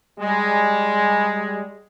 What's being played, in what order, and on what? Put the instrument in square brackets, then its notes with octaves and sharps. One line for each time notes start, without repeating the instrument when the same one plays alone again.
[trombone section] G3 G#3